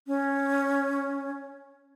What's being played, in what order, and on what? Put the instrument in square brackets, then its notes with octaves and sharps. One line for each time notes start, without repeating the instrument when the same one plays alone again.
[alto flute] C#4